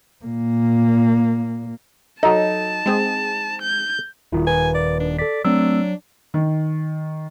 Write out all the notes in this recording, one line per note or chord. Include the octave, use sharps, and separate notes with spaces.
A#2 A#3
F#3 D#4 A4 A5
G#3 C4 G#4
G6
D#1 D#3 E4 F4
B4 G#5
D5
D4
A4 D5 B6
F#3 A3 C4 D4 E6
D#3